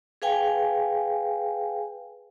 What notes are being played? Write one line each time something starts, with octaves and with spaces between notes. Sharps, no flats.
G#4 B4 F5 G5 G#5